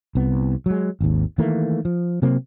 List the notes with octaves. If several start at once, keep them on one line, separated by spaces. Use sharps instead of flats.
C2 B3
F#3 G#3
G#1 D#2
D#3 E3 A3 A#3
F3
C3 F#3 A#3 C4